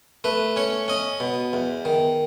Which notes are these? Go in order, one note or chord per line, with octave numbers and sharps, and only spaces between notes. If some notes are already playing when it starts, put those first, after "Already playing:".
A3 B4
C#4 C#5
C#4 D#5
B2
E2
D#3